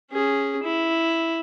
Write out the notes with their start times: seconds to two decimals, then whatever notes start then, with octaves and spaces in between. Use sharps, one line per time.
0.11 C#4 G#4
0.63 E4